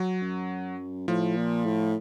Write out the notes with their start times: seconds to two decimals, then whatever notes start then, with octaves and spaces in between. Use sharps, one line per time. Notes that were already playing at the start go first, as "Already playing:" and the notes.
Already playing: F#3
0.22 F#2
1.08 A2 F3
1.37 A#2
1.66 A2